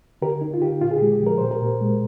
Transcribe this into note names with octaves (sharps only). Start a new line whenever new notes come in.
D3 G4 A#4
D#4
F4
D3 G4
A#2 F4
G#4
G4
G#3
G4
F3 A#4
A#2 C5
G4 A#4
A#2
G#3